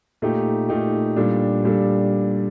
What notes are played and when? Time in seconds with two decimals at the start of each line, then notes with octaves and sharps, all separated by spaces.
0.22 A#2 A3 D#4 G4
0.69 A#2 A3 D#4 G4
1.17 A#2 G3 D4 A4
1.64 A#2 G3 D4 A4